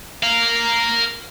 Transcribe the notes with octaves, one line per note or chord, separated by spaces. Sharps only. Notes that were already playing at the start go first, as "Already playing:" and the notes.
A#4 F5